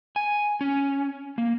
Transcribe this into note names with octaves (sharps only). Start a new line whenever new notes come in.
G#5
C#4
A#3